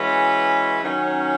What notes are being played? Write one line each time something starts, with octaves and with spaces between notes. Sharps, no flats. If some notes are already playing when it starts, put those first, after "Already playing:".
Already playing: E3 G#3 C#4 F#4 B4
D#3 F#3 C#4